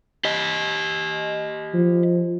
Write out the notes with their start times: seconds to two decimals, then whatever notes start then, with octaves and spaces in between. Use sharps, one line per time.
0.25 G4 D#5
1.74 F3